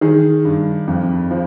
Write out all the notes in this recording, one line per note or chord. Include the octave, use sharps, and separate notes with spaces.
D#3 G#4
G2
F2
F3